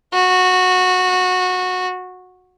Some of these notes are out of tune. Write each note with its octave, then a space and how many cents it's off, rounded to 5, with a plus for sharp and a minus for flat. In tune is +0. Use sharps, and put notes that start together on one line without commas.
F#4 -15